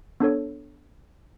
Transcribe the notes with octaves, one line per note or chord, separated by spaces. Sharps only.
B3 D4 A4 C#5